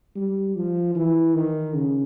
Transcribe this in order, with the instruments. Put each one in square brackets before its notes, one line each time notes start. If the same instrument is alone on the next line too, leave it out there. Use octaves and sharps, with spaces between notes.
[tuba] G3
F3
E3
D#3
C#3